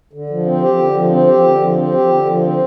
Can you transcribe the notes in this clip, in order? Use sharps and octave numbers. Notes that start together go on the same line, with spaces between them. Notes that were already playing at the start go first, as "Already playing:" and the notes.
D3
F3
C4
G4
D3
F3
C4
G4
D3
F3
C4
G4
D3
F3
C4